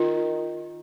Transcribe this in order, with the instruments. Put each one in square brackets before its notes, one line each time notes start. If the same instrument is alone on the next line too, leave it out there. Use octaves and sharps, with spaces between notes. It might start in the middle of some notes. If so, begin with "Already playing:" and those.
Already playing: [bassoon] D#3 [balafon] F4